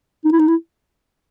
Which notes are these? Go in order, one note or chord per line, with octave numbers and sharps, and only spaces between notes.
D#4
E4
D#4
E4